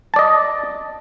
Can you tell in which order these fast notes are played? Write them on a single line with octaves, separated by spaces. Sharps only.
A5 D5 D#5